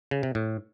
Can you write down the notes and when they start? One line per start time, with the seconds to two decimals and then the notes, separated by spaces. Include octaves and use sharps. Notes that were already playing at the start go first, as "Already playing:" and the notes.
0.11 C#3
0.23 C3
0.35 A2